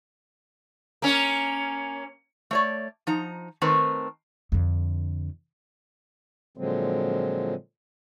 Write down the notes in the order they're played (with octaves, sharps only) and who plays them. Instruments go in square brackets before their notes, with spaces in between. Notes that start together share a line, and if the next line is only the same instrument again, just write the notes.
[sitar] A#3 C#4
[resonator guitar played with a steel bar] A3 C#5 D5
F3 D#4 A#5
D#3 A3 C4 A#4 B4
[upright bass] F2 D3
[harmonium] A#2 D3 F3 F#3 G#3 C4